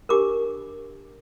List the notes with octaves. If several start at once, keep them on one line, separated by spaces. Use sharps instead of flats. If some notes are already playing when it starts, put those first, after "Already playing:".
D4 G4 A#4 D6